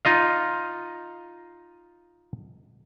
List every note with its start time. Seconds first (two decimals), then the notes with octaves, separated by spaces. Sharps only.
0.05 D#4 F4 D#5 F5